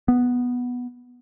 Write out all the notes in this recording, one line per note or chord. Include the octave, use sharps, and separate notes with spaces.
B3